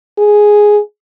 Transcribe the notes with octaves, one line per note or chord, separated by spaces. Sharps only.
G#4